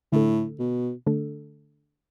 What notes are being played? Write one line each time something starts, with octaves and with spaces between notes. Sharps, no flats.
A2 D3 A3 D4 A4
B2
D3 A3 D4 A4